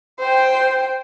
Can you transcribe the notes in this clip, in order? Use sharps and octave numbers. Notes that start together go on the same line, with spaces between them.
C5 G5